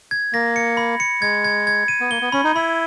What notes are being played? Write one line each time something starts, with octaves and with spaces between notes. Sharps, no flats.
G#6
A#3 A#6
C#7
B5
C#7
G#3 G#6
G#6
G#6
D#7
B3
A#3 G7
B3
C#4 B5
D#4
E4 B5